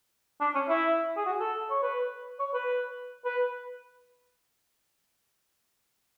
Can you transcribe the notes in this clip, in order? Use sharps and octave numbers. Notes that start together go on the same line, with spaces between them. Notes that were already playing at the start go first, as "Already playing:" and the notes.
D4
C#4
E4
G#4
F#4
A4
C#5
B4
C#5
B4
B4